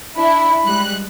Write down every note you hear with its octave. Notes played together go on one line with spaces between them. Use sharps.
D4 E4 B5
G3 G#3 F#6